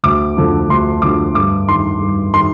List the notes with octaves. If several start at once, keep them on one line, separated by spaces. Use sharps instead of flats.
D2 D6
D3 F3
D2 C6
D3 F3 D6
G2 D6
D#3 C6
G2
D#3 C6